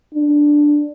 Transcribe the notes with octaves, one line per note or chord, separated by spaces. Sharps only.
D4